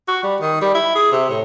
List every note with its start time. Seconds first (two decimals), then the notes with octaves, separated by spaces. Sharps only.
0.08 F#4
0.23 G3
0.41 D#3
0.61 G3
0.74 E4
0.95 G#4
1.12 C3
1.30 A2